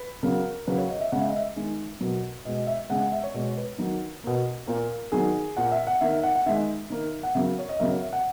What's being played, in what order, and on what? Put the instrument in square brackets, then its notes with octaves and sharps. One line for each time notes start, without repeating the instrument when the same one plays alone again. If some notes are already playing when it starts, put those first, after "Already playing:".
Already playing: [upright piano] B4
C#3 F#3 A#3 A#4
C#3 F#3 A#3 B4
C#5
D#5
E5
C#3 G#3 F#5
E5
D#5
E5
D#3 G#3
B2 F#3 A#3
B2 G#3 D#5
E5
C#3 G#3 F#5
F#5
E5
C#5
B2 G#3 C#5
B4
D#3 F#3 A#3
B2 A#3
A#2 A#3 A#4
D#3 F#3 A#3 G#4
A#2 A#3 F#5
E5
F#5
D#3 A#3 E5
E5
F#5
F#5
D#3 G#3 E5
D#3 A#3
F#5
C#3 F#3 A#3 E5
C#5
D#5
C#3 F#3 A#3 E5
C#5
E5
F#5